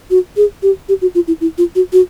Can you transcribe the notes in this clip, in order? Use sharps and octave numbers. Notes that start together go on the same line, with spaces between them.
F#4
G#4
G4
G4
F#4
F4
E4
E4
F4
F#4
F#4